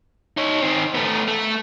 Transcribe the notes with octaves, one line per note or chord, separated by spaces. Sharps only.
D#4 C#5
D#3 C4
A3 B3
A3